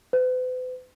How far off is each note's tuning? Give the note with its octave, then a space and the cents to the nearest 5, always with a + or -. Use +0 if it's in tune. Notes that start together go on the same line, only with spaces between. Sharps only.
B4 +45